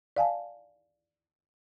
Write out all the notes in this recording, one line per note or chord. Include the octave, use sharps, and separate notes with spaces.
D5 F5 G#5 A5